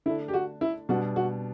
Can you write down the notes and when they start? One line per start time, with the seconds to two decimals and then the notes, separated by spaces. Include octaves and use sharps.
0.06 D3 A3 D4 E4
0.28 G4
0.34 F#4
0.61 E4
0.89 B2 G3 D4 F#4
1.16 F#4